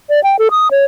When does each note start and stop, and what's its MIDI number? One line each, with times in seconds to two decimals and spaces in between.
0.10 0.22 74
0.23 0.36 79
0.39 0.48 69
0.51 0.68 87
0.71 0.85 73